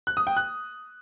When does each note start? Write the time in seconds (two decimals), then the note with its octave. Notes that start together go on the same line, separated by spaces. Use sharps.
0.07 F#6
0.17 D#6
0.27 G5
0.37 F#6